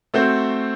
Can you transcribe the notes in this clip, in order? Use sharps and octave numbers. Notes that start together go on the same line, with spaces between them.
A3 C4 F#4 C5